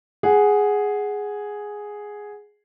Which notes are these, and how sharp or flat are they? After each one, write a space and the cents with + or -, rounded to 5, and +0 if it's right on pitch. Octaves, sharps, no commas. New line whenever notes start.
G#4 +0 F#5 +0